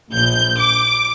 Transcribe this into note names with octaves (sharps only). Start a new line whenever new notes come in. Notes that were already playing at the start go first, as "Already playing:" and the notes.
A#1 G6
D6